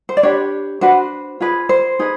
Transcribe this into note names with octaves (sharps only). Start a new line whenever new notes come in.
C5
D5
D4 G4 B4 C#5
D4 F#4 B4 C5
F4 G#4 B4
C5
D#4 G#4 B4